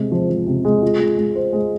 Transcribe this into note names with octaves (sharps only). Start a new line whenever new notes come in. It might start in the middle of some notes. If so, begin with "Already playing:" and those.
Already playing: C3 G#3
F3
F3
C3
G#3
F4
G#3
G#3
C5
G#3